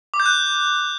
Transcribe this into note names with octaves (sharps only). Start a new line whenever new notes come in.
D6
G6
F#6